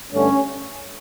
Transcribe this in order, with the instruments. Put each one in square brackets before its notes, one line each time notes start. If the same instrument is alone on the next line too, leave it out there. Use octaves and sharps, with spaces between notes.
[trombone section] G2 D3 A3 C#4